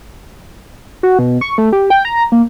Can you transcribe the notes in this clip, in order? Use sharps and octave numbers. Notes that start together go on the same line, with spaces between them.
F#4
B2
C#6
A3
G4
G5
A#5
A#3